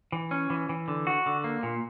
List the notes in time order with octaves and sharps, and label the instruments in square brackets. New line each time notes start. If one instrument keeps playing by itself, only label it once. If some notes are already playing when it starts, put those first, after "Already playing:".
[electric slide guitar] E3
C#4
E3
E3
D3
F#4
D3
A#3
A#2